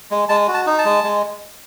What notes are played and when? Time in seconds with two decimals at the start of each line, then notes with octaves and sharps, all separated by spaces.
0.11 G#3
0.29 G#3 A5
0.48 F#4
0.54 A5
0.67 D#4
0.79 A5
0.85 G#3
1.04 G#3